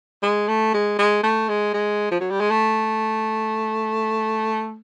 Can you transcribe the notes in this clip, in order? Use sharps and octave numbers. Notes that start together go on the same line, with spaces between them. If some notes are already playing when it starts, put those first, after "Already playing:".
G#3
A3
G#3
G#3
A3
G#3
G#3
F3
F#3
G3
G#3
A3